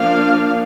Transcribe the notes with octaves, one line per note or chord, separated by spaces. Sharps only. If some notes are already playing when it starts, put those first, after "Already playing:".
Already playing: F3 A#3 D4 F5